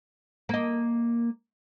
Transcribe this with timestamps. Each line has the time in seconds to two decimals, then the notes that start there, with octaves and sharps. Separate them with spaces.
0.49 A#3 D#5